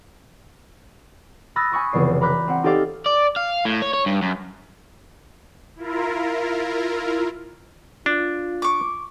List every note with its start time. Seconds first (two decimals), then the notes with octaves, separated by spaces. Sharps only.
1.56 B5 D#6 E6 F#6 A6 A#6
1.72 G#5 B5 C#6 D#6
1.92 F1 C#3 E3 B3 D5 C7
2.21 A#5 B5 D6 F#6 G6 B6
2.48 C4 F#5
2.63 D#4 G4 A4 D5 F5 D6
3.06 D5
3.36 F5
3.65 A2
3.82 C#5
3.93 C#5
4.06 G2
4.22 F#2
5.76 E4 F4 A#4
8.06 D4 F4
8.62 C#6 D6